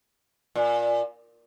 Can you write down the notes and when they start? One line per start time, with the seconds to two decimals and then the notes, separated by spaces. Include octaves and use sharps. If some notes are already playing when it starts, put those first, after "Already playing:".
0.55 A#2